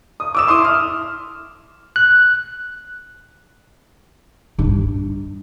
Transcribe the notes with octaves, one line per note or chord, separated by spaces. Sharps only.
D#6
D6 E6 E7
E4 C6 D6 D#6
F6
F#6
G2 D#4